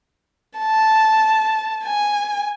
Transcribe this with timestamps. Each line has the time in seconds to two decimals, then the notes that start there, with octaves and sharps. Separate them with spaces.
0.59 A5
1.84 G#5